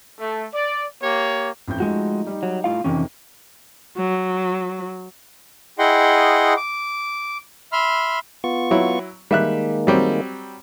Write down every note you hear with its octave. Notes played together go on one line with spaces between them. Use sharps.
A3
D5
A#3 G4 C#5
A1 F2 G6
F3 G#3 A3 D#4 F#4
G3 D#4
F#3
A2 F4 F5
F2 C3 D#3 E3 C#4
F#3
E4 G#4 D#5 F#5 G5 C6
D6
E5 B5 C6 F6
B3 F4 C#6
F#3 E4
D#3 G3 G#3 A#3 E5 F#6
F#3 G3 C4